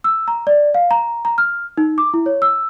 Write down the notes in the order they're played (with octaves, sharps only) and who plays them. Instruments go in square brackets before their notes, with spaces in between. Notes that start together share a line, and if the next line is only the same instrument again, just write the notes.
[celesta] E6
A#5
D5
F5
A#5
A#5
F6
D#4
D6
E4
C#5
E6